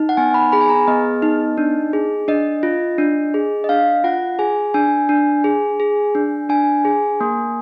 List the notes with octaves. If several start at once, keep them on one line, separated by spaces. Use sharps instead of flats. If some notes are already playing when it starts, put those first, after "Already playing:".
Already playing: D#4
F#5
B3 G#5
B5
G#4 B5
G#5
A#5
B3 D#5
D#4
D4
G#4
D4 D#5
F4
D4
G#4
D#5
D4 F5
F4 F#5
G#4 G#5
D4 G#5
D4
G#4
G#4
D4
D4 G#5
G#4
A#3